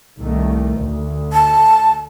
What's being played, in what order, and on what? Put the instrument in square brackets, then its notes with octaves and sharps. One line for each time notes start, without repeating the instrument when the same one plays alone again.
[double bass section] C2 D#3 A3
D2
[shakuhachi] A5